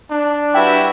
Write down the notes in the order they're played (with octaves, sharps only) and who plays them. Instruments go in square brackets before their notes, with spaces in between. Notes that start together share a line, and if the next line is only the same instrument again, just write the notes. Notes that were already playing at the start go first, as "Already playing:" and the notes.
[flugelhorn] D4
[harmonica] G3 E4 E5 [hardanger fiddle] F#4 B4 [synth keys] G5